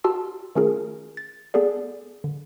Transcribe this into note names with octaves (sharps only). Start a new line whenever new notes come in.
F#4 G4 A5 C6 E6 F6
D#3 A3 C#4 F4 G#4 A#4
A6
B3 G#4 A4 D5
D3